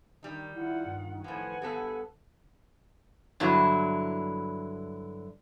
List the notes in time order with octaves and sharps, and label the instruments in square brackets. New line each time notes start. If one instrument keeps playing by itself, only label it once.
[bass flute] D#3 [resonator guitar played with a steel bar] G3 D#4
[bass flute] D#3 [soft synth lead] E4 [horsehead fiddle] F4 F#5
[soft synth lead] G2
[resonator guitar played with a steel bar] A2 F3 [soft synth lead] B4 [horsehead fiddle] F#5 G#5
[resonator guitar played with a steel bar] G2 B3 A4 [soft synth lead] G4
[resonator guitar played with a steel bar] G2 D3 F#3 E4